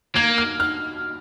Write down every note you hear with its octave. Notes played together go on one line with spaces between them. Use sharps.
A#3 G#6
F6
F6